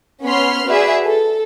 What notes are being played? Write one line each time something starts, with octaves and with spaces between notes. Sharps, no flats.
B3 C#4 C#5 B5 C6 F6
F#4 G#4 B4 D5 E5
A4